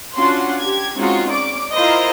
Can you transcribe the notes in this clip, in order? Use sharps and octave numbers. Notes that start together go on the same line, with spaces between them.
C#4 D4 F4 F#4 F#5 C6
G4 G#6
G#3 C4 C#4 D#4 F4 F#4
C#4 D5 D6
E4 F4 A#4 C5 D#5